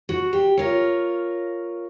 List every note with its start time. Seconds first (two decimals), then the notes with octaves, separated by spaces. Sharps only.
0.09 F#4
0.33 G4
0.57 F4 A#4 C#5